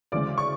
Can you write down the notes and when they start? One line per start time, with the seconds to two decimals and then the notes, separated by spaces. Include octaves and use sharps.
0.12 D2 C#3 E3 G#3 D5 D6
0.38 C#6